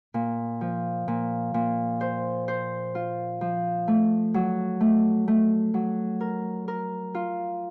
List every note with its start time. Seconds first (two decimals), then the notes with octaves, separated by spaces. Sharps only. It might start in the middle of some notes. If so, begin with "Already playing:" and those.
0.14 A#2
0.61 F3
1.08 A#2
1.54 A#2
2.01 C5
2.48 C5
2.95 F4
3.41 F3
3.88 A3
4.34 F#3
4.81 A3
5.28 A3
5.74 F#3
6.21 A#4
6.68 A#4
7.15 F4